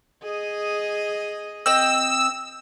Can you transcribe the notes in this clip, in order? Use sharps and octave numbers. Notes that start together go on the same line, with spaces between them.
G#4 D#5
C4 D#5 E6